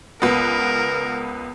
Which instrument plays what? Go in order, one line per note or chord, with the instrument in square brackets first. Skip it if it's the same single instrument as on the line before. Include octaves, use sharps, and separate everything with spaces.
[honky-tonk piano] C#2 B3 [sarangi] A#4